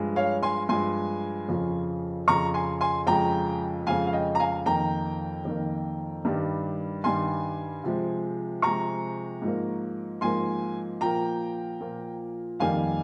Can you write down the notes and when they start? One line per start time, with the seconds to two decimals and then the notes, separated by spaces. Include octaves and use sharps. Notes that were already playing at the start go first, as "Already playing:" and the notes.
Already playing: G2 F3 G#3
0.16 C#5 F5
0.43 G#5 C6
0.69 G2 F3 G#3 G#5 C6
1.49 F2 C#3 F3
2.28 F2 C#3 F3 A#5 C#6
2.54 G#5 C6
2.81 G#5 C6
3.07 F2 C#3 F3 G#3 G5 A#5
3.86 F2 C#3 F3 G#3 F5 G#5
4.07 F5
4.13 D#5 G5
4.35 A#5
4.40 F5 G#5
4.66 F2 D#3 A#3 G5 A#5
5.45 F2 D#3 A#3
6.25 G2 D#3 G3
7.04 G2 D#3 G3 G#5 C6
7.84 C3 F3 G#3
8.62 C3 F3 G#3 A#5 C#6
9.42 G#2 F3 A#3
10.21 G#2 F3 A#3 G#5 C6
11.01 A#2 F3 A#3 G5 A#5
11.80 A#2 F3 A#3
12.60 F2 D#3 G3 A#3 F5 G#5